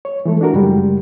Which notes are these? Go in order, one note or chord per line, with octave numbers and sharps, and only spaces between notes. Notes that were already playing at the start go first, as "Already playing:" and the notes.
C#5
E3 G#3 A3 A4
D4 E4 F#4 A#4
F#2 C#3 G3 G#3